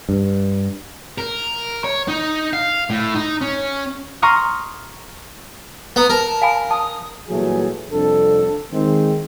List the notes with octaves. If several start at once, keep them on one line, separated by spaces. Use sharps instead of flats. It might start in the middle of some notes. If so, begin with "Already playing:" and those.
G2
A#4
C#5
D#4
F5
A2
D#4
C#4
A#5 C6 C#6 D#6 F6
B3 A#5
A#4 A5
F5 G#5 B5
A5 D#6
A#2 E3 F#3 G3 A3 G#4
C2 F2 D4 A4
D#3 G#3 C4